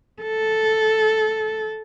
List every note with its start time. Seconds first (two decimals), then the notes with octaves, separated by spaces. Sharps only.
0.22 A4